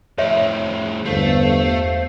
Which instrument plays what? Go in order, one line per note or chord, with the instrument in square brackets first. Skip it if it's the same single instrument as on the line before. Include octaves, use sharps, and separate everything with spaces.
[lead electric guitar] F2 A2 [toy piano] C#5 E5
[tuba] G1 [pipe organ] E2 C5 F5 [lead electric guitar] A3